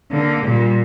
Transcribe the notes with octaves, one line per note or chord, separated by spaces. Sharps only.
D3 A#3
A#2 G3